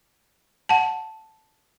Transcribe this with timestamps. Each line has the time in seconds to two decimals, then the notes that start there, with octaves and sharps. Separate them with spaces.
0.69 F#5 A5